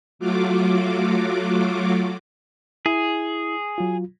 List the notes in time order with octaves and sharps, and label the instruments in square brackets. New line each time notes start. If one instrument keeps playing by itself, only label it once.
[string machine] F#3 A3 F4 F#4 D6
[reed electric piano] E4 [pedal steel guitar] G#4
[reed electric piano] F#3 F4